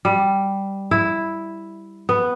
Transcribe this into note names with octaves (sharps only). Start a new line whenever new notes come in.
G3
E4
B3